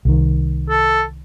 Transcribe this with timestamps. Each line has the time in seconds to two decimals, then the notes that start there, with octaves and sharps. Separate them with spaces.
0.05 C2 D#3
0.69 A4